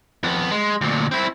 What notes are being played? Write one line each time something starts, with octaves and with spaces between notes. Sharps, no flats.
F2 B3
G#3
D2 A#2
C4 E4